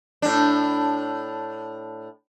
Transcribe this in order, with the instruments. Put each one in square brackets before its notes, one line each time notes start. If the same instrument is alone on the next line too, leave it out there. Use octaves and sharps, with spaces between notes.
[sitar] A2 D4